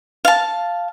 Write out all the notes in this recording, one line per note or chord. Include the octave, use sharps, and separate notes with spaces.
F5 A5